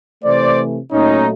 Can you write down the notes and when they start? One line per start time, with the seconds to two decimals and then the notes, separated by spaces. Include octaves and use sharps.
0.24 C3 E3 A3 C5 D5
0.91 A#2 F#3 A3 C#4 D#4